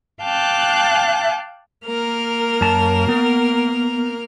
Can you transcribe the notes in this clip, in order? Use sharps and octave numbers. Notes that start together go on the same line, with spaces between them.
F5 G5 A5 D6 F#6 G6
A#3 A#4 F6
F#2 A5
B3